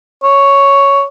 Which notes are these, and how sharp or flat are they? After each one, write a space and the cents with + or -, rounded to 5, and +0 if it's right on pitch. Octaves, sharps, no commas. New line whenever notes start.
C#5 +5